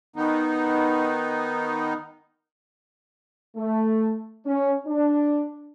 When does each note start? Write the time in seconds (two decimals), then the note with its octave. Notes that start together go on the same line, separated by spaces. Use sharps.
0.16 D#3 B3 D#4
3.56 A3
4.46 C#4
4.87 D4